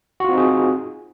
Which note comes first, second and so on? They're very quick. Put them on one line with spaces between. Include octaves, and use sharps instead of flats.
F#4 F4 C4 D#4 G#4